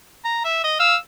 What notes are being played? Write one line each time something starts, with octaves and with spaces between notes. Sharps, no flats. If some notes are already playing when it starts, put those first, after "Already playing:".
A#5
E5
D#5
F5 E6